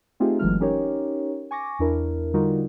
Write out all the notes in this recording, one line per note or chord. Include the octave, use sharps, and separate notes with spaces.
A3 C4 D#4 F4 G4 G#4
G1 E3 F#3 G#3 A3 F6
C#4 D#4 G4 A#4 C#5
G#5 C#6 D6 A#6
E2 D4 E4 A#4
D3 G3 D#4 F4 F#4 A#4